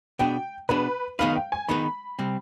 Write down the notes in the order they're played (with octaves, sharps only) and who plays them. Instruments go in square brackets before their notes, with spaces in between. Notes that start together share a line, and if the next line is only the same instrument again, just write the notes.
[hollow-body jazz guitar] B2 B3 D4 G#4 [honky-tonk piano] G5
[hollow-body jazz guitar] B2 B3 D4 G#4 [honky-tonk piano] B4
[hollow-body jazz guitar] D#3 B3 D#4 G#4 B4 [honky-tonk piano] F5
[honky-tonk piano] G5
G#5
[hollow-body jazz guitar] D#3 B3 D#4 G#4 B4 [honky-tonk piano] B5
[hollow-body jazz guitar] C3 G3 C4